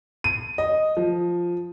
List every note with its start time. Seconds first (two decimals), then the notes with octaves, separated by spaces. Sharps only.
0.24 D#7
0.58 D#5
0.97 F3